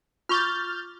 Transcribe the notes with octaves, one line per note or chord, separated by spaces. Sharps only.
F4 C#6 D6 F6 G6 A6